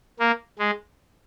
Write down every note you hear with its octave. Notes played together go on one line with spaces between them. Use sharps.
A#3
G#3